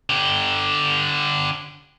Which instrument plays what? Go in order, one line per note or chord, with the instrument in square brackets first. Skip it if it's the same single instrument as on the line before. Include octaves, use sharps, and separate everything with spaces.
[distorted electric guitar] D3 G4